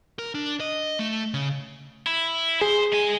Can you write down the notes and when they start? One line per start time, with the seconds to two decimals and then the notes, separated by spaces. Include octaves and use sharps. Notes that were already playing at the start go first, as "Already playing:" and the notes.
0.19 A#4
0.35 D4
0.60 D#5
0.99 A3
1.34 C#3
2.07 E4
2.61 G#4 C5
2.92 G#3 G#5